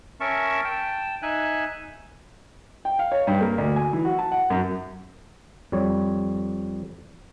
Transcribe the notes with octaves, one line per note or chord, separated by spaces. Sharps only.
C#4 A#4 E5 A5 C#6
G5 A5
D#4 E5 G#5 F#6
G5
F5
C#5
G2
A#3
D2
G#5
E3
F#4
A5
F#5
F#2
F2 G3 C#5